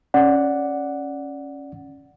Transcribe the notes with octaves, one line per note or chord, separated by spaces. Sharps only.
C#4 D5 F#5